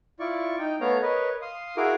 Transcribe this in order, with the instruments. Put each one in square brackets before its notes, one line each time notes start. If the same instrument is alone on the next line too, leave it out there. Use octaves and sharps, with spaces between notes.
[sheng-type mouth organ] E4 F4 D5 C#6
D#4 G5
A3 B3 C#5 F5 A#5
A#4 B4 C#5 D#5
F5 C6 D#6
E4 F#4 G#4 A#4 F5 D6